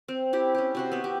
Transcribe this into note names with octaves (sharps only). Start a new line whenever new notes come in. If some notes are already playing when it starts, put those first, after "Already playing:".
C4
E4 G4
C#4 G4
C3 F#4 C5
B3 E5
G4